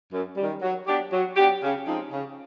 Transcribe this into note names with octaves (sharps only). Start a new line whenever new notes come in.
F#2
D#3 G3
F#3
B3 D4 G4
F#3
B3 D4 G4
C#3
F3 G#3 C4 D#4
C#3